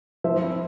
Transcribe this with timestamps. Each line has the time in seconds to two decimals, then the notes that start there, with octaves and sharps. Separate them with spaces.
0.24 F3 C5 E5
0.42 C4 E4